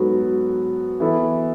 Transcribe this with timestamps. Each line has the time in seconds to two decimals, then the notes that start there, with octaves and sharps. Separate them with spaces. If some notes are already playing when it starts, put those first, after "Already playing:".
Already playing: G#2 F#3 B3 F#4 A4
1.00 E3 B3 E4 A4